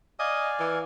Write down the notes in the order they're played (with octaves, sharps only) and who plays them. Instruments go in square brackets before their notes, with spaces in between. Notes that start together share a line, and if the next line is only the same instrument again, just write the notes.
[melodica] D5 F5 G#5 [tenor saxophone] D#5
[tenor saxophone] E3